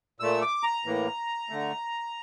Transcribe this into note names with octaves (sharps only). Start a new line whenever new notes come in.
A#2 A3 E6
D6
A#5
A2 E3 A#3
D3 A3